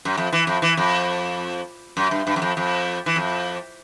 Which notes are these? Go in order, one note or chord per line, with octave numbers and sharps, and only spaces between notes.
F#2
F2
E3
F2
E3
F2
F#2
G2
G2
F#2
F2
F2
E3
F2